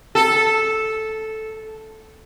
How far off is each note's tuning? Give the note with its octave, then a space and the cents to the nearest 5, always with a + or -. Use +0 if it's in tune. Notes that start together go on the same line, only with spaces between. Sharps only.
A4 -5